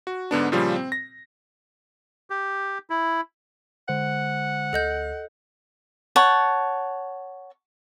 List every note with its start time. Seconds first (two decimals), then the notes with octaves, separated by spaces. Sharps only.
0.07 F#4
0.31 G#2 D3 B3 D4
0.52 A#2 C#3 F3 G3 F4
0.76 C4
0.92 A#6
2.30 G4
2.90 E4
3.89 D3 G#3 C5 F#5
4.73 D2 A4 D#5 G6
6.16 C#5 F#5 A5